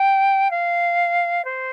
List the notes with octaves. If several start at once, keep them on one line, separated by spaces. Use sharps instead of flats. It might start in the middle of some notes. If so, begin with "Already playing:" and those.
Already playing: G5
F5
C5